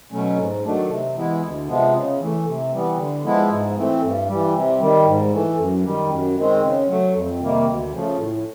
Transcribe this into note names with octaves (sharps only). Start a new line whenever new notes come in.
B2 F#3 A3 C#4
G#2
D#3 F#3 A3 D4
C3
E3 G#3 B3 E4
D2
C3 F3 G#3 B3
C#3
E3 A3
C3
E3 G3 B3
D3
F3 G#3 B3 E4
G#2
E3 A3 C4
G2
E3 G3
C3
D#3 G3
G#2
E3 A3
F#2
D#3 G3
F#2
D#3 G#3 C4
C#3
F#3 A3
F2
C3 D#3 G3 A#3
D2
C#3 F3 A3
A2